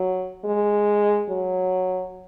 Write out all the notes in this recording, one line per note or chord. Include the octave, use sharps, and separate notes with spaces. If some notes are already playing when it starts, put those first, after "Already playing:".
Already playing: F#3
G#3
F#3